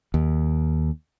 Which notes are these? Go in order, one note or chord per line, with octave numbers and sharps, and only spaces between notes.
D#2